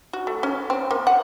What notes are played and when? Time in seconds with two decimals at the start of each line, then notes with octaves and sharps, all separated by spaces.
0.13 F#4
0.27 A3
0.43 C#4
0.70 C4
0.91 A#3
1.07 F#5